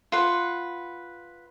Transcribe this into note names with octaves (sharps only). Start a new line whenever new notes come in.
F4 B4 F#5